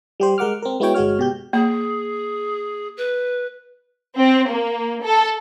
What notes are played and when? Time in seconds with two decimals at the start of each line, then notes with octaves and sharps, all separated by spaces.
0.20 G3 G4 C5
0.38 G#3 A#4 F#5 D6 F6
0.62 C4 A#4
0.80 G#3 B3 E4 F#4 C#5 G5
0.94 G1 G#3 F#4 C#5 F6
1.19 B2 G4 G6
1.53 A#3 G#4
2.97 B4
4.16 C4
4.49 A#3
5.02 A4